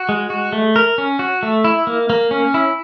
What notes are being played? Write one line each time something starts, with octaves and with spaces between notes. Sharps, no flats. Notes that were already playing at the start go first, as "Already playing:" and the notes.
Already playing: F#4
G#3
F#4
A3
A#4
C#4
F#4
A3
E4
A#3
A#3
C#4
E4